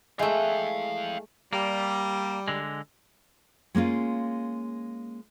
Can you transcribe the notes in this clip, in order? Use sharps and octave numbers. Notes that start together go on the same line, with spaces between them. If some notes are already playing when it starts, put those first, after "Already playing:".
E3 G#3 A3 F5 G5
G3 A#3
D3 G#3
G#3 A#3 C#4 F4